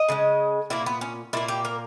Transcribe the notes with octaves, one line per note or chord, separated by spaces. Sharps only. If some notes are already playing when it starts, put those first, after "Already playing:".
Already playing: D#5
C#3 E3 G#3
A#2 A#3 E4
B3
C#4
A#2 A#3 E4
G4
A#4